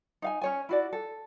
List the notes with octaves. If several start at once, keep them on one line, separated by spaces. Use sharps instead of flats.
D#4 F5 G#5
C#4 C#5 G#5
E4 F#4 D5
A4